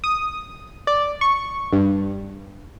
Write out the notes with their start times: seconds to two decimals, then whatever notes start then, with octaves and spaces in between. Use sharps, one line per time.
0.04 D#6
0.87 D5
1.21 C#6
1.73 G2